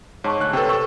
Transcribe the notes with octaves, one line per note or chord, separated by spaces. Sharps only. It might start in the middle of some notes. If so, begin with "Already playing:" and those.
G#2 C#5 A5 C#6
D2 F#6
C3 C4 A4 B4 C#5 G5
A4 C#6 E6